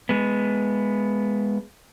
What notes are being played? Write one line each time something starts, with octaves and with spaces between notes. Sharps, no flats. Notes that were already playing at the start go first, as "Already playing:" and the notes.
G#3 B3